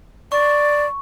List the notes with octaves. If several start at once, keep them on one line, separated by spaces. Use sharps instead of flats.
D5 C#6